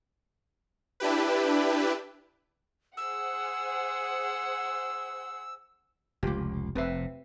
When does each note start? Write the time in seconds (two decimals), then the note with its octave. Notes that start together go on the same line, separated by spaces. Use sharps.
1.00 D4 E4 G4 B4
2.97 G#4 C5 F#5 E6
6.23 F1 C#2 F4 G4
6.75 F1 C3 C4 B4 E5